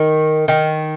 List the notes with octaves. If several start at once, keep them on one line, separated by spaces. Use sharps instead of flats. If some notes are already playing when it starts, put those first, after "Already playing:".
Already playing: D#3
D#3